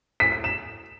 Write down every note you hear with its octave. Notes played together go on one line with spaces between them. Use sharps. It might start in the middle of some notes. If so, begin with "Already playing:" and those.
B6
B6
E7